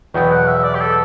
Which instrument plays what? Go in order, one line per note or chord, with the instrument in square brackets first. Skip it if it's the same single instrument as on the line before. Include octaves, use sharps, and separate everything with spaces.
[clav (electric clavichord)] E2 B2 F#3 B3 [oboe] G5
[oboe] F#5
E5
D5
G4
A4